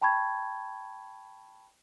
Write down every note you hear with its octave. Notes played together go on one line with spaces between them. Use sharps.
G5 A5 B5 C#6 G#6